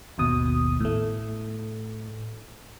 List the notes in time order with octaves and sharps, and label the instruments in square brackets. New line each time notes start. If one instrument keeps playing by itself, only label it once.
[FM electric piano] G#1 D#2 B2 D#6
A2 A3